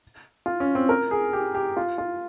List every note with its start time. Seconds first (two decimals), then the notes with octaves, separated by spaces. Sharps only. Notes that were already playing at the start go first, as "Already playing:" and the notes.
0.46 F4
0.60 C#4
0.75 C4
0.89 A#4
1.11 G#4
1.33 G4
1.55 G4
1.77 F4
1.98 F4